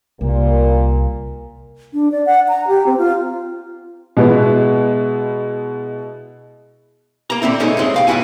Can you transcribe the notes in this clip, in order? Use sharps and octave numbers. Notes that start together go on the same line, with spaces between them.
C2 A#2 A#3
D4
D5
F#5
A#5
G4
C4
F4
B2 G#3 B3 E4
A#3 A#5
A#2 D3 C4 E4
B2 G#3 A3 C#4 D#4 C5
F#2 A2 G#3 C4
C2 F5 G5
G#2 B2 D3 E4 F#4 G#5